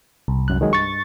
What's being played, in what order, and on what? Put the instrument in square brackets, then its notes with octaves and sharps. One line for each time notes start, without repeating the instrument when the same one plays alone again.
[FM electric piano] C2
[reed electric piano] F#2 F#6
D#3 F#3 G#3
[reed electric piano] G2 [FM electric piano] C#6 A6